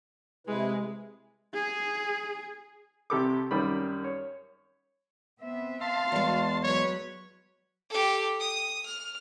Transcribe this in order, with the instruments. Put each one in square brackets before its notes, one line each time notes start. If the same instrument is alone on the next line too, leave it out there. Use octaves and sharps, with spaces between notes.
[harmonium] C3 E4 B4 [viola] G#3
[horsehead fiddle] G#4
[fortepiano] C2 C3 G4 A4 B5 D6
F#2 D#3 G3 B5
C#5
[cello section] B3 C4 E5
[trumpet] F5 [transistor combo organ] A5 C6
[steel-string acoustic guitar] E2 G#3 [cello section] F#4
[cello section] F#3 B4 [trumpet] C#5
[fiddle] G4 A4
D#6
F6